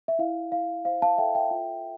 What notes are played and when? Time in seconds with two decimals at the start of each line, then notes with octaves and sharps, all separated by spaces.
0.08 E5
0.19 E4 F5
0.52 E4 F5
0.85 C5 F5
1.02 F5 A5
1.18 A4 E5 G5
1.35 E5 G5
1.51 F4